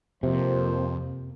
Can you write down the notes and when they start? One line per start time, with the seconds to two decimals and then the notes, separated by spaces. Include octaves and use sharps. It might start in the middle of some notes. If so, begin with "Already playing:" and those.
0.23 F2 C3 F3 A#3 C5